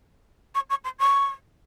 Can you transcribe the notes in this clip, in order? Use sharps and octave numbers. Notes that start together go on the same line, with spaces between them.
C#6
C#6
C6
C#6